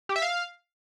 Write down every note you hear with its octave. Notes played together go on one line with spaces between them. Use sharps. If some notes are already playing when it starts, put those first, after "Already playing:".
G4
E5
F5